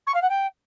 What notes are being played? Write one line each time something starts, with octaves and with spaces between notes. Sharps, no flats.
C#6
F5
F#5
G5